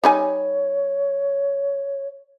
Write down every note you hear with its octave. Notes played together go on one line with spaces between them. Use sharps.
G3 D#4 C#5 G#5